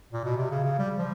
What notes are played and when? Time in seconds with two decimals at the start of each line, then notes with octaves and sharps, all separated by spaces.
0.13 A#2
0.25 B2
0.37 C3
0.51 C#3
0.64 C#3
0.79 G3
0.98 F3